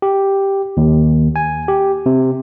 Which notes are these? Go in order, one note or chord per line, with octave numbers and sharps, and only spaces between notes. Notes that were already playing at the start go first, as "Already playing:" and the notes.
G4
D#2
G#5
G4
C3